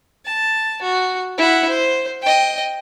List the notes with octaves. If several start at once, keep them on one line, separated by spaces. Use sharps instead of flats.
A5
F#4
E4 F#5
C5
D#5 G5